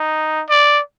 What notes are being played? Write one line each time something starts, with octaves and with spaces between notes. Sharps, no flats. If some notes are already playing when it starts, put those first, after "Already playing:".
Already playing: D#4
D5